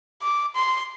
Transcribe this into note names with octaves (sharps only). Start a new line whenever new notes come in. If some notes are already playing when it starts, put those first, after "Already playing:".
D6
C6